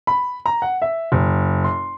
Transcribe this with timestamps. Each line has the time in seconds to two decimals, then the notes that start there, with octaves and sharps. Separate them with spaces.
0.07 B5
0.46 A#5
0.62 F#5
0.82 E5
1.12 F#1
1.64 C6